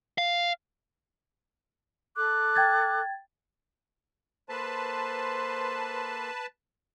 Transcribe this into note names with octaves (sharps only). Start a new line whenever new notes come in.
F5
A4 D6 F#6
G5 G#6 A6
A#3 A4 B4 C5 A5 C6